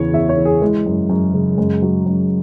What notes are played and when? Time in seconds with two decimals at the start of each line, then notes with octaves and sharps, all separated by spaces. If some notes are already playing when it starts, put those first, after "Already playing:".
Already playing: E2 C#3 E3 C#5
0.13 E2 E5
0.29 C#5
0.38 E3
0.45 G#4
0.61 E3 G#3
0.86 F#2
1.10 F#2
1.34 C#3
1.58 F#2 G#3
1.82 F#3
2.06 F#2